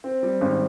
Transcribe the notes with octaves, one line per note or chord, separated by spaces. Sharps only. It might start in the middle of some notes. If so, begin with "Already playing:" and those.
C4
G3
G#1